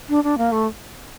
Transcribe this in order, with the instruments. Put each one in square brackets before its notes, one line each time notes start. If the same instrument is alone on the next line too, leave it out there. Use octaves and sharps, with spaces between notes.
[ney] D4
D4
A#3
A3